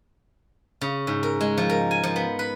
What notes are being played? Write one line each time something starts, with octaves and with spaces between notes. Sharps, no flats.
C#3
G#2
A#4
G#3
F3
A#4
G#5
F3
B3
B4